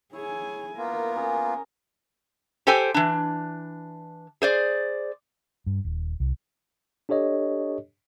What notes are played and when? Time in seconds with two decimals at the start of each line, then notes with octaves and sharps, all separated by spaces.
0.13 E4 G#4 C#5 G#5
0.77 A#3 B3 F4 A#4
1.15 C#4 G#4 A#5
2.67 G4 A4 C5 G5 G#5
2.94 E3 D4
4.42 G#4 C5 D5
5.66 G2
5.84 D#1
6.20 C2
7.09 D4 G4 A4 C#5 D#5